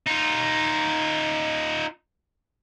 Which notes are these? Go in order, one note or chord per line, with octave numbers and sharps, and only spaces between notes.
D#4 F4